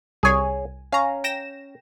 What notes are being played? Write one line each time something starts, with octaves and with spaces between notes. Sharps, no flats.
C2 G#4 C#5 G#5
C#4 F5 A#5
G5 A#6 E7